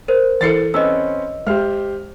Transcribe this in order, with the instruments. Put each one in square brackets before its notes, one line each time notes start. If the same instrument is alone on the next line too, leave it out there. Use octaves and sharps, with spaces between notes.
[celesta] A#4 C5
[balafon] E3 E4 A4 [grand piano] A6 C7 C#7
[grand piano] C4 C#4 B4 [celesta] D#5 E6
[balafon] G#3 [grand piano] G4 C5 F6